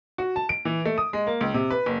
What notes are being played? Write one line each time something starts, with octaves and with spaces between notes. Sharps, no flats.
F#4
A5
D7
E3
A3
D#6
G#3
A#3
C#2
C3
B4
F#1